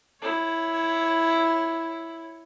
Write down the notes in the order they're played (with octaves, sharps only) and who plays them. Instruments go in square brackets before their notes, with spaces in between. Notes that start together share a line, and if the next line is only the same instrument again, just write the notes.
[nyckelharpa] E4 C#5